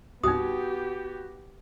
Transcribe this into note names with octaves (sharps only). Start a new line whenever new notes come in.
C2 G2 B3 D#4 F#4 G4 D#6